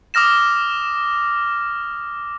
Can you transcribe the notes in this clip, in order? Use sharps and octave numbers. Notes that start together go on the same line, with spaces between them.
D6 D#6 F6 A#6 E7